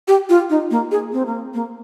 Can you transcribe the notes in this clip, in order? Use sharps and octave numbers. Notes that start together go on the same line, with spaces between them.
G4
F4
D#4
A#3
G#4
C4
A#3
A#3